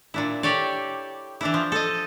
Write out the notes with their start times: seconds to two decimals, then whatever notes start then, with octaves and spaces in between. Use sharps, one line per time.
0.14 A#2 D4 E4
0.43 G4 A4 C#5 D5
1.41 E3 D4 E4
1.54 F3
1.72 A4 D#5